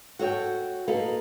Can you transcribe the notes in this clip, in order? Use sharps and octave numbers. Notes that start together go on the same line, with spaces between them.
F#4 A4 C#5 E5 G5
A#3 D#4 A4 B4